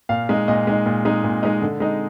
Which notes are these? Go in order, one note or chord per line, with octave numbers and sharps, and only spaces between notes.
A#2 F5
G#3 D#4
A#2 D#5
G#3 D#4
A#2
G#3 D#4
A#2
G#3 D#4
D3
G#3 D#4